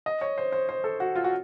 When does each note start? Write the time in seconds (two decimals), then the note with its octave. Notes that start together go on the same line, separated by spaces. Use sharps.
0.06 D#5
0.21 C#5
0.38 C5
0.52 C5
0.69 C5
0.84 A4
1.00 F#4
1.15 F4
1.24 F#4